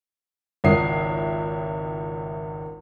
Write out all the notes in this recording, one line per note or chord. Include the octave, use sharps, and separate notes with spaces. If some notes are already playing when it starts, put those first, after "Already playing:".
G#1 C#2 C#3 E4 D#6 C7